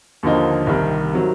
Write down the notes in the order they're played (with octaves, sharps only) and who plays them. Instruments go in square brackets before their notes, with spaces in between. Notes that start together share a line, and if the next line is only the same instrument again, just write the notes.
[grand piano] D#2 D3 F3 A#3 D#4
C2 C3 D#3 G3
C3 D#3 F#3